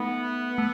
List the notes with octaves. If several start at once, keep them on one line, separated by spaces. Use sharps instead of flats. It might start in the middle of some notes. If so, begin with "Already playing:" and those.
Already playing: A3 B3 D#4 A4 E5
A3